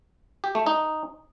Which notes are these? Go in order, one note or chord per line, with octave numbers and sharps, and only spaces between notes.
G4
A3
D#4